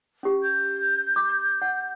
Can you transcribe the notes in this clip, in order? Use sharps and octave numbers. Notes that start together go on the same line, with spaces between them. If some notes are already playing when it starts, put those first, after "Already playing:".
C#4 G4
G6
D6
F#5